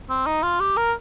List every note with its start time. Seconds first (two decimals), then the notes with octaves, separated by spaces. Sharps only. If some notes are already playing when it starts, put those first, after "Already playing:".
0.10 C4
0.27 D#4
0.43 F4
0.60 G4
0.77 A#4